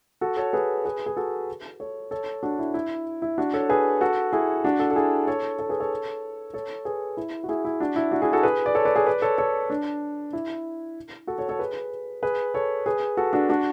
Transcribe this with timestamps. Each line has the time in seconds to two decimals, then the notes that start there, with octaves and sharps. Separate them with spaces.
0.21 F#4 A4
0.37 A4 C#5
0.53 G#4 B4
0.85 G#4 B4
1.06 G#4
1.17 F#4 A4
1.80 A4 C#5
2.11 A4 C#5
2.43 D4 F#4
2.59 E4
2.74 E4
3.22 E4
3.38 D4 F#4
3.54 A4 C#5
3.69 G#4 B4
4.01 F#4 A4
4.33 E4 G#4
4.64 D4 F#4
4.80 F#4 A4
4.91 A4
4.95 E4 G#4
5.27 A4 C#5
5.59 A4 C#5
5.69 G#4 B4
5.80 A4 C#5
6.54 A4 C#5
6.85 G#4 B4
7.17 E4
7.44 F#4
7.49 E4 G#4
7.65 E4
7.80 D4 F#4
7.96 E4
8.11 D4 F#4
8.22 E4 G#4
8.33 F#4 A4
8.43 G#4 B4
8.66 D5
8.75 A4 C#5
8.85 B4 D5
8.96 G#4 B4
9.07 B4 D5
9.22 A4 C#5
9.38 A4 C#5
9.70 D4
10.33 E4
11.27 F#4 A4
11.38 A4 C#5
11.49 A4 C#5
11.59 G#4 B4
12.23 G#4 B4
12.54 A4 C#5
12.86 G#4 B4
13.17 F#4 A4
13.33 D4 F#4
13.49 D4 F#4